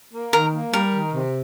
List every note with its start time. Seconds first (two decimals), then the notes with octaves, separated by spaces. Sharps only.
0.13 A#3
0.33 D#3 A#4
0.54 A#3
0.72 G3 A#4
0.93 D#3
1.13 C3